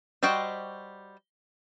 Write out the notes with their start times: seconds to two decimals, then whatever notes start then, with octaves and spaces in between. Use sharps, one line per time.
0.23 G3 F#4 C5 D#5 G5